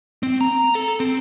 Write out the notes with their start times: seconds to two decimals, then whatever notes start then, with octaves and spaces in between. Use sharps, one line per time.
0.23 C4
0.41 A#5
0.75 A4
1.00 C4